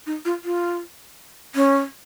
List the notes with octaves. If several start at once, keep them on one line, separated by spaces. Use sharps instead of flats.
D#4
F4
F4
C#4